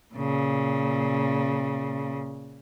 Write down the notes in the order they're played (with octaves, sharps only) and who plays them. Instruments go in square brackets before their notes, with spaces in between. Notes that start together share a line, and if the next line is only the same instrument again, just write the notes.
[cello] A#2 C#3